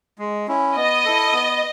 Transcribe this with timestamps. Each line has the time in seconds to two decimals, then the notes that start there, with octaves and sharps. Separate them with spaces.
0.18 G#3
0.48 C#4 E4
0.76 B3 D#5
1.05 E4 A4
1.33 B3